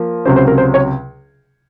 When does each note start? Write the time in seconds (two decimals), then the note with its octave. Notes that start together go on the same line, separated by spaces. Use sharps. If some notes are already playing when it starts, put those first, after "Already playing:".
Already playing: F3 A#3
0.25 C#2 C3 F#3 C#4 C5
0.36 C5
0.48 A#4
0.58 C5
0.74 C#5